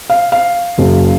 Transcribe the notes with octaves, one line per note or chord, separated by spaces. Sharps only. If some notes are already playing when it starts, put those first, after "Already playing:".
F5
F5
F#1 F#2 C#3 F#3